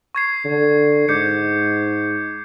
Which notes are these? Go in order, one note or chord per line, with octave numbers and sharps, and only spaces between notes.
C#6 G#6 C7
D3
G#2 D6 G6 C#7